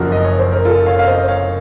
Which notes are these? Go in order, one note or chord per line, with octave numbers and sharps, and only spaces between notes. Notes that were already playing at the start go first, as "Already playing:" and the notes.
Already playing: F#1 F#2 F3 F#4 A#4
D#5
C#5
C5
A#4
F4 A4
C#5 F5
F5
C5 D#5
C#5 F5